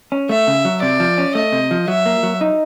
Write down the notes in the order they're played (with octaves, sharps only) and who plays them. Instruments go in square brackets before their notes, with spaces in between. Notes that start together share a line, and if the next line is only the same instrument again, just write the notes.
[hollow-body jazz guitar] C#4
[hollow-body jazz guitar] A3 [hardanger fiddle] E5
[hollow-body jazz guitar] C#3
F#3
[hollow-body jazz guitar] C3 [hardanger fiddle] D5
[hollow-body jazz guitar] F3
C#4
[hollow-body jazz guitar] A3 [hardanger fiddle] D#5
[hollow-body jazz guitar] C3
F3
[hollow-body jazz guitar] F#3 [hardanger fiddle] E5
[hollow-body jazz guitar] A#3
F#3
D#4